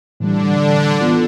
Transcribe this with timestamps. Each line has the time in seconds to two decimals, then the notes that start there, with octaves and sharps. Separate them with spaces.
0.20 A2 D3 E3 G3 D4
1.01 E3 B3 F4